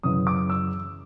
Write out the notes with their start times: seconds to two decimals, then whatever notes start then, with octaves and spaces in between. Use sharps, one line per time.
0.03 F#2 C#3 E3 D#6
0.27 D6
0.50 E6